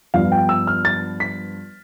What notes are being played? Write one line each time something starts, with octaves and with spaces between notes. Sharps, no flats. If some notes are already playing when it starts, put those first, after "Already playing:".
G2 F3 B3 D4 F5
G5
E6
F6
A6
B6